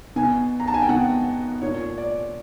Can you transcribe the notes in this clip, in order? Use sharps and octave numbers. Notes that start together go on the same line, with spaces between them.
B2 G#5
A#5
A5
G#5
G5
B2 F#5
A#2 C#5
D5